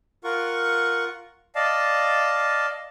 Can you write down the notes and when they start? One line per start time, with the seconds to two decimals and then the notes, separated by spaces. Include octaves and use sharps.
0.24 F4 A#4 F#5 C#6
1.55 D5 D#5 F5 A5